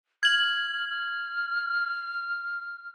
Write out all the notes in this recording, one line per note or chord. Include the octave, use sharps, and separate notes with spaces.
F6 G#6 F#7
F6